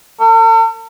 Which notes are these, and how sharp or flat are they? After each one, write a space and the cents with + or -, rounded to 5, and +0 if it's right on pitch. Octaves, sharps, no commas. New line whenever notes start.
A4 +45